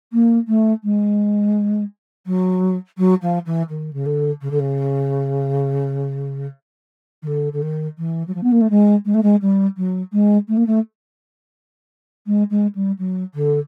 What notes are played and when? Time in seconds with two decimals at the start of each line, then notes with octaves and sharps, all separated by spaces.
0.13 A#3
0.48 A3
0.84 G#3
2.27 F#3
2.98 F#3
3.22 F3
3.46 E3
3.69 D#3
3.93 C#3
4.06 D3
4.41 C#3
4.51 D3
4.59 C#3
7.22 D#3
7.27 D3
7.53 D3
7.62 D#3
7.98 E3
8.28 F#3
8.35 F3
8.43 B3
8.52 A#3
8.61 A3
8.70 G#3
9.05 G#3
9.14 A3
9.23 G#3
9.42 G3
9.77 F#3
10.13 G#3
10.48 A3
10.57 A#3
10.67 A3
12.27 G#3
12.50 G#3
12.75 G3
12.99 F#3
13.34 D3